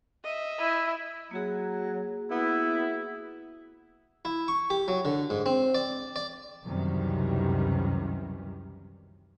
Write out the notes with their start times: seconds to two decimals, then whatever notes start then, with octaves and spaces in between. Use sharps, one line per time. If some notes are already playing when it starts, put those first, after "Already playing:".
0.24 D#5 E5
0.60 E4
1.31 F#3 A#3 F#4 G#4
2.31 B3 E4
4.25 E4
4.48 C#6
4.70 G4
4.88 F#3
5.05 D3
5.30 G#2
5.46 C4
5.75 D5
6.16 D5
6.65 C#2 F#2 C3 D#3 E3 G3